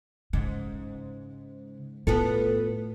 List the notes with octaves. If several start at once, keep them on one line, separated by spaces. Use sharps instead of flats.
G#2 C#3
A2 B3 F4 A4